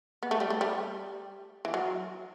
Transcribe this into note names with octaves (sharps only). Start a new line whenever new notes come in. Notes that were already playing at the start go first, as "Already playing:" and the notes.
B3
A3
G3
A3
G3
E3
F#3